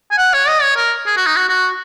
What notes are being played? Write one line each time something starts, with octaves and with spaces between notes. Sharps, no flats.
G#5
F#5
C#5
D#5
C#5
A#4
G#4
F#4
D#4
F#4
F#4